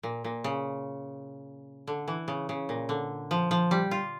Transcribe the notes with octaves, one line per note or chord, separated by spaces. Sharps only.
A#2
A#2
C#3
D3
E3
C#3
C#3
A#2
D3
F3
F3
G3
F4